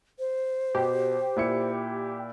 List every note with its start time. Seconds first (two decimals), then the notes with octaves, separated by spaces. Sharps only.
0.19 C5
0.75 B2 G4
1.36 A#2 E4 C#7